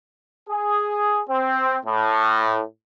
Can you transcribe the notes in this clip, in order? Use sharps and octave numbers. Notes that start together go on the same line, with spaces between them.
G#4
C4
A2